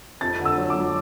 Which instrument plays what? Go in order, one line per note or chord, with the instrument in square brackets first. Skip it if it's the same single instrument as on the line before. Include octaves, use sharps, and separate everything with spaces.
[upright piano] F2 A6
D3
E6
F#3
D6
F#3